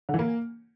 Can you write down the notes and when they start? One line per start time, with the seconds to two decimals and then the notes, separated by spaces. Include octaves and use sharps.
0.09 D3
0.14 E3
0.19 A#3